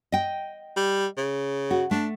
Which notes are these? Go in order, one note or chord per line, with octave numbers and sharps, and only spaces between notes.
D#5 G5
G3
C#3
F#4
A3 D4